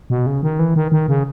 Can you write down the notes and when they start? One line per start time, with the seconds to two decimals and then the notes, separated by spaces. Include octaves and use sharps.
0.10 B2
0.26 C#3
0.43 D#3
0.59 E3
0.76 D#3
0.92 D#3
1.08 C#3